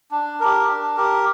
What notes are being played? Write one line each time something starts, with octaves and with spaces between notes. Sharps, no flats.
D4
G4 A#4
D4
G4 A#4